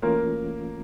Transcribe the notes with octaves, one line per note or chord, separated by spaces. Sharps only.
E3 A3 A#3 C#4 F4 A#4